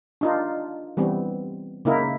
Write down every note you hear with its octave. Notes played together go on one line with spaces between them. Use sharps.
D4 D#4 F4
E3 G3 B3 C4
C#3 A#3 D#4 E4 A#4